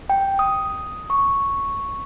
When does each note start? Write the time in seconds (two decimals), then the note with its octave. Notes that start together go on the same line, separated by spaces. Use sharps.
0.10 G5
0.39 D#6
1.10 C#6